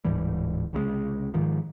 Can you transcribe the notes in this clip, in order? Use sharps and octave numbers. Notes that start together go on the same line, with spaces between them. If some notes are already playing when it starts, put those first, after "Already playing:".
D1 G#2 E3 G3
C2 C#3 F#3 G#3
G#2 D#3 F3